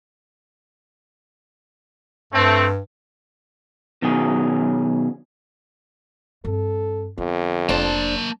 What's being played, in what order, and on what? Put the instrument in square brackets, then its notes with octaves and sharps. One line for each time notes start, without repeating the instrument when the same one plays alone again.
[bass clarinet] G2 [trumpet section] A3 C4
[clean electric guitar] B2 D#3 F#3 C#4 G#4
[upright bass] G2 C4 [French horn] A4
[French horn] F2 [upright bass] D3 B3
[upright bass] F1 [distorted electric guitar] A#3 A5 [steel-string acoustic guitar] D4 C5